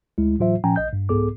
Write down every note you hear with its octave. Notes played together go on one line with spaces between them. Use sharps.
D2 G#3 E4
A2 E3 F#3 F4 C5 E5
A#2 F3 C#4 G5 G#5 A#5
A#1 D#5 G6
G2
C2 G#2 B3 G#4 A4 D6